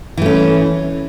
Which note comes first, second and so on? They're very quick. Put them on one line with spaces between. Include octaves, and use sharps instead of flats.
E3 A3 C#4